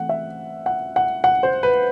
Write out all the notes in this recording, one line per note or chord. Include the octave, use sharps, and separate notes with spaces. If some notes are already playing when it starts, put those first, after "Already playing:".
Already playing: E3 A3 C4 F#5
E5
F#5
F#5
F#5
C5
B4